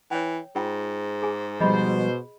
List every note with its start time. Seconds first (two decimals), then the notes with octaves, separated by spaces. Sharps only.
0.11 E3 C#5 G5
0.56 G#2 F4 G5
1.22 G#4 G#5
1.60 B2 F3 G3 G#4 C5 D#5 B5